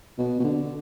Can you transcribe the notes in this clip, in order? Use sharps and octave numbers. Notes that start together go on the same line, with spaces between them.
B2
B2
D3